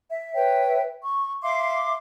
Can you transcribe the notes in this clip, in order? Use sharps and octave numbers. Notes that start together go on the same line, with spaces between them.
E5
B4 C#5 E5 G5
C#6
E5 F5 C6 D6